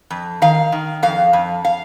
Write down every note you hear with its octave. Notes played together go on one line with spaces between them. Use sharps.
F2
D#3 F5
D#3
F2 F5
F2
F5